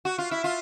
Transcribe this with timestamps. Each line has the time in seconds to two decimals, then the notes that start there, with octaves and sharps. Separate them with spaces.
0.05 F#4
0.18 F4
0.31 E4
0.44 F4